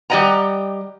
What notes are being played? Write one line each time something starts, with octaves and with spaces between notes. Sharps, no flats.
G3 G4 D5 D#5 F#5 A#5